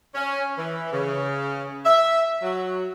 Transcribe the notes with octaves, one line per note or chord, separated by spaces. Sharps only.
C#4
E3
C#3
E5
F#3